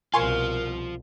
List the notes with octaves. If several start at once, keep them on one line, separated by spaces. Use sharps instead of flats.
C2 B2 F4 A#4 C5 G#5 C6 C#6